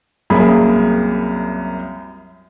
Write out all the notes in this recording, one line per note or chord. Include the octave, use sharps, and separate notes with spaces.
C2 F#2 A#3 G#4 B5